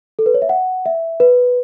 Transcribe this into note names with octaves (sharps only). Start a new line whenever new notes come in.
A4
B4
C#5
E5
F#5
E5
B4